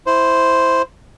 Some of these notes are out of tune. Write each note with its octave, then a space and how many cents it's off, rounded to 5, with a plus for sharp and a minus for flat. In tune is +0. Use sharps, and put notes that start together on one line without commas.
E4 +0 C5 +0